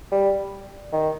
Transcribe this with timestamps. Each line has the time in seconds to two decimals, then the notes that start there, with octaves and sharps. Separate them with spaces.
0.12 G3
0.93 D#3